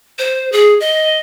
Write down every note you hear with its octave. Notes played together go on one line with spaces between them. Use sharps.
C5
G#4
D#5